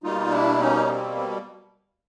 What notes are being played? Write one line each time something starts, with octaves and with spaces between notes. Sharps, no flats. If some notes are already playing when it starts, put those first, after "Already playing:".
B2 G3 A#3 D#4 F4
D4 E4
C#4 D#4
C4
C4